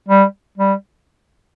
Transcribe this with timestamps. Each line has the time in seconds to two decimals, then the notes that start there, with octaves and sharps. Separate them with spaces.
0.09 G3
0.58 G3